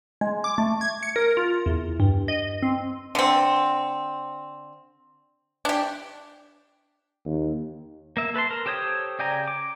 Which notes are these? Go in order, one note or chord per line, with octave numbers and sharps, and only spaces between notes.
G#3
D6
A3
G#6
C#7
A#4
F4
E2
G2
D#5
C4
D3 C4
D4 G4
D#2
A#3 E5
A4 B4 A5 C6
A#4
G4 A4 C5 C#5 D#6
C#3 D5 G5 G#5 A#5
D6